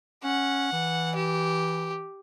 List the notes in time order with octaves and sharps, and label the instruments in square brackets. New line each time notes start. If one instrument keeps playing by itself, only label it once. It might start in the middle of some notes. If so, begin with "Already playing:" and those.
[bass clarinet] C#4 [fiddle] F#5
[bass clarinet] E3
[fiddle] G4